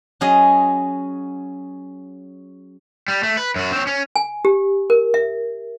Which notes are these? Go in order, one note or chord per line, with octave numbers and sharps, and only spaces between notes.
F#3 C#4 G#4 D#5
G3
A3
B4
F#2 F#4
C4 C#5
C#4
G#5
G4
A#4
E5